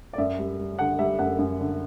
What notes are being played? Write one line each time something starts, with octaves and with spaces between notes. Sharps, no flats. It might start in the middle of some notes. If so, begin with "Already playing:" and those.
D5
F#2 E5
G3
G3
D3 F#5
G3 E5
F#2 F#5
F#2
D3